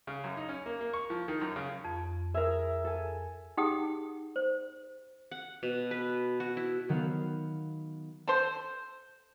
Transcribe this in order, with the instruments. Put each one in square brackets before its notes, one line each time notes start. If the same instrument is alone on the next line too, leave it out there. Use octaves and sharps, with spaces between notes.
[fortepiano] C#3
F#2
D#4
C#4
A#3
A#3
C#6
F3
D#3
F#2
C#3
[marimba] F2
[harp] G#4 A#4 [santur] E5
[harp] A4 G#5
[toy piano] D#4 G4 G#4 F#5 G5 D#6
C5
[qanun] F#5
B2
B4
F#4
E4
[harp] D#3 F#3 B3 F5
[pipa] A4 C5